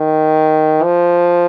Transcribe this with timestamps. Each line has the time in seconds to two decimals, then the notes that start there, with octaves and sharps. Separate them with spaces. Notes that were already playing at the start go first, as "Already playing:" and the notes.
Already playing: D#3
0.83 F3